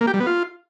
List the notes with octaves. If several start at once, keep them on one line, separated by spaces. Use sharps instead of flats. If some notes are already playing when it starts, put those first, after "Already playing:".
A#3
G4
G3
B3
F4